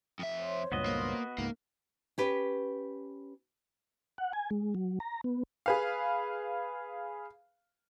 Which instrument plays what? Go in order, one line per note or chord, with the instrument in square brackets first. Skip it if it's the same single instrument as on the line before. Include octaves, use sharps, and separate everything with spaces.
[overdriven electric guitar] F2 E5
[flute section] C5 C#5 C6
[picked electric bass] C#2 G2 A#2 [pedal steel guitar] B3 F#4 D#5
[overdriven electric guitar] A#3
[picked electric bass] C#2 G#2 [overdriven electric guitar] A#3
[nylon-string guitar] C#4 G4 B4
[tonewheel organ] F#5
G#5
G#3
F#3
A#5
B3
[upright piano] G#4 B4 F5